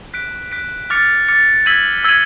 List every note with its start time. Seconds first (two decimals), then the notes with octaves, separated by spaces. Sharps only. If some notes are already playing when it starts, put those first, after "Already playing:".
0.14 F#6 B6 D7
0.52 F#6 B6 D7
0.90 D6 F6 A6 C#7
1.28 D6 F6 A6 C#7
1.66 E6 G#6 B6 D#7 F#7
2.04 E6 G#6 B6 D#7 F#7